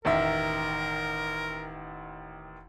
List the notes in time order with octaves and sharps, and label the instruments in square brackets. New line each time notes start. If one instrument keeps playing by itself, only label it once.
[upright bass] E1 C#4 [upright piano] A1 D#3 E5 [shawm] A#4